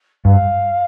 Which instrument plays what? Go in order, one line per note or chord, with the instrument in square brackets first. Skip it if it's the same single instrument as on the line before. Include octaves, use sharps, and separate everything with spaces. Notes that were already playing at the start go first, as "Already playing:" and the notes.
[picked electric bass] G2 [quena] F5